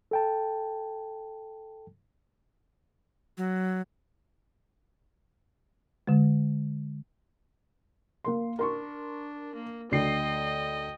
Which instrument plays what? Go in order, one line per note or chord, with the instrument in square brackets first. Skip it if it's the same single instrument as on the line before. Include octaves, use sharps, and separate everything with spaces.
[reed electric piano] A4 G5 A5
[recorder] F#3
[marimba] D3 G#3
[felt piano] A#3 A#4 C6
[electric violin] D4 [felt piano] A#4 C6 C#6
[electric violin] A#3
[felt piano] D2 D3 C7 [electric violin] D#5 G5